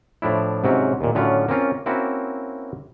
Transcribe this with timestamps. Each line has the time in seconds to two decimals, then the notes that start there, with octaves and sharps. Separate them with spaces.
0.22 A2 F3 D4 E4
0.64 G#2 C3 F#3 C4 C#4
1.01 D#2 A#2
1.15 A2 D3 F#3 C#4 F4
1.49 A#3 C4 C#4 F4
1.86 A#3 C4 C#4 E4 F#4